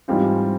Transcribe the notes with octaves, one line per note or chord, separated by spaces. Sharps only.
G#2 E3 G3 C4 F4